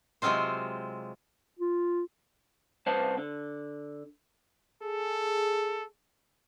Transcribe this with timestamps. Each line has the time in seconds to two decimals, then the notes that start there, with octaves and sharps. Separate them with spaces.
0.22 C3 F#3 G#3 C4 F4 C5
1.59 F4
2.86 C2 B4 C5 F#5 A5
3.18 D3
4.83 G#4 A4